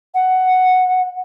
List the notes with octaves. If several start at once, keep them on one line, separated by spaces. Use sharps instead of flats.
F#5